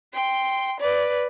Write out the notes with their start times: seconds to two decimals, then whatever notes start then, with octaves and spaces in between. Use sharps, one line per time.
0.14 G5 C6
0.80 B4 D5